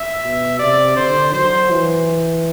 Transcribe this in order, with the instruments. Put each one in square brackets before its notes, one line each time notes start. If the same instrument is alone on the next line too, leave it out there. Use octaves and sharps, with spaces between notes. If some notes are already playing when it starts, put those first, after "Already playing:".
Already playing: [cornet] E5
[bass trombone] B2
[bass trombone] C3 [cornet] D5
[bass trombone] D3 [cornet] C5
[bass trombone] F#3 [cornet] C5
[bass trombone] E3